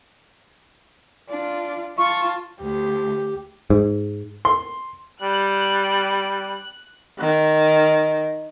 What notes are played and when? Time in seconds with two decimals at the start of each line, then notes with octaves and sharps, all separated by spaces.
1.29 D4 F4
1.98 F4 A5 C#6
2.62 D2 G4
3.70 G#2
4.45 C6
5.22 G3 F#6
7.19 D#3